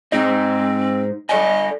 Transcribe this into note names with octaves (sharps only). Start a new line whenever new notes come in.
G#2 C4 D#4 D#5
A4 D5 D#5 G#5